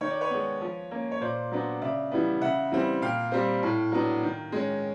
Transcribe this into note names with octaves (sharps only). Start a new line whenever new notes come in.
D#3 C#5
D5
B4 C#5
G#3 B3
F3
A#3 C#4
C#5
A#2 C5 D5
F#3 B3 D4
C#3 D5 E5
E3 G3 B3
C#3 E5 F#5
E3 G3 C4
A#2 F5 G5
G3 C4
A2
F#3 B3 D4
D#3
G#3 C#4